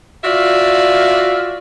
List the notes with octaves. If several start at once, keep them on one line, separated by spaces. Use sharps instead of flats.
F4 F#4 D5 E5 F5